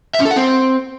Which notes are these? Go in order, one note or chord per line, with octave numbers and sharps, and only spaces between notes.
E5
C#4
A4
F#5
C4